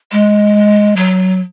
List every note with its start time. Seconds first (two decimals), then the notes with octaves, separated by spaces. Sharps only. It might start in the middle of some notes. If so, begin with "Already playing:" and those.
0.12 G#3
0.96 F#3